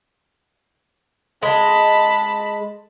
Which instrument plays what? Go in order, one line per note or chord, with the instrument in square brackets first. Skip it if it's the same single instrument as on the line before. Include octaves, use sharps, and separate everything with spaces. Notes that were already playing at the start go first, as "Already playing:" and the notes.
[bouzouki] G#3 [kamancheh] A5 B5